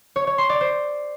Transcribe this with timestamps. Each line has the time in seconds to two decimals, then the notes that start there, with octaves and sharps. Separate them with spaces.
0.16 C#5
0.27 C#5
0.38 C6
0.49 D5
0.61 C5